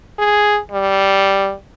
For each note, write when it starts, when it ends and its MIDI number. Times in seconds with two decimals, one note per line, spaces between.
0.19 0.59 68
0.72 1.53 55